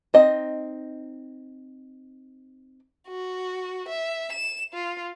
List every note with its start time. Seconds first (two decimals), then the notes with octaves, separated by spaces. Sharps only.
0.14 C4 D#4 D#5
3.08 F#4
3.88 E5
4.33 E7
4.73 F4